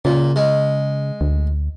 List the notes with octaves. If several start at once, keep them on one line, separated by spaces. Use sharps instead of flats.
A#2 C#3
G#3
D2